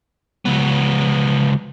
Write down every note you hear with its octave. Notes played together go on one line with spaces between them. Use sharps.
C#2 B3